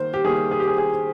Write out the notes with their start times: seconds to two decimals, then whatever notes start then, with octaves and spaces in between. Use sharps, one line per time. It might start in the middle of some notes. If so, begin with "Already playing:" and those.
Already playing: D#3 A#3 C5
0.14 G4
0.24 D#3 G3 A#3 G#4
0.51 G#4
0.60 G4
0.68 G#4
0.78 G#4